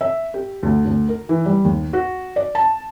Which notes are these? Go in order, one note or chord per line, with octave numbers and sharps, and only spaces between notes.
E5
G4
D2
D2
A#4
E3
G3
D#2
F#4
D5
A5